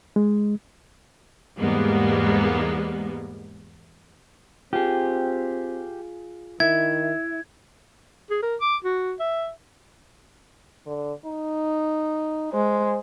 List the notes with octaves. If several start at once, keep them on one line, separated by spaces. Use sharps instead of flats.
G#3
E2 G#2 G3 G#3 A#3 B3
C4 F4 G4 G#4
D#3 E4 E5 G#6
G#4
A#4
D6
F#4
E5
D3
D#4
G#3 C5